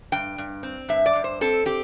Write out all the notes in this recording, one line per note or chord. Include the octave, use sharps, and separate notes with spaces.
G2 G5
G2
C4
G2 E5
D5
G2
C5
C4 A4
C4 G4